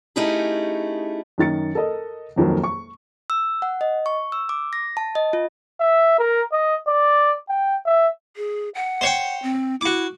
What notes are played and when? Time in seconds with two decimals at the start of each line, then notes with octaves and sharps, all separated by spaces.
0.16 A3 C#4 D#4 E4 G4 G#4
1.38 F#2 D#3 A6 C#7
1.75 A4 A#4 D#5
2.36 D#1 F2 D#3 F#3 A#3
2.64 C#6
3.30 E6
3.62 F#5
3.81 D#5
4.06 C#6
4.32 E6
4.49 D6
4.73 A#6
4.97 A5
5.15 D#5
5.33 F4
5.81 E5
6.19 A#4
6.52 D#5
6.88 D5
7.50 G5
7.86 E5
8.36 G#4
8.75 F#5
9.01 C5 C#5 G5
9.43 C4
9.81 E4 F#4 D6